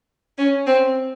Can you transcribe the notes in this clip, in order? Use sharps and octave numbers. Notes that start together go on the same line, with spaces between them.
C#4
C4